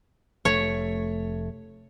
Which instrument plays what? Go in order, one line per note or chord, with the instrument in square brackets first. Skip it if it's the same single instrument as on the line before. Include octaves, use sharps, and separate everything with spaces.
[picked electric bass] F1 A3 [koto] C#5